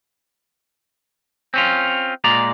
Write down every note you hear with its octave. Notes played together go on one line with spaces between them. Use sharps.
C4 C#4 F4
A#2 G#3 D5 A#5